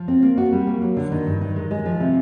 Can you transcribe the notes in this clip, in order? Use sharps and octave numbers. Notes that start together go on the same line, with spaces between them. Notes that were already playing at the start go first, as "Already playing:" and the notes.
Already playing: F3
C4
A#3
F#4
G3
A#3
F#3
D3
D#3
G2
D#3
G#3
G#3
F3
C3